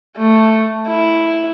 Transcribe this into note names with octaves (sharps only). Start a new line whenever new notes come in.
A3
E4